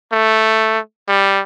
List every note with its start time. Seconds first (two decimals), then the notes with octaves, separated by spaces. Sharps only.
0.13 A3
1.08 G3